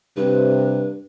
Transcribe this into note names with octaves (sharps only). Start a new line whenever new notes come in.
G2 C3 B4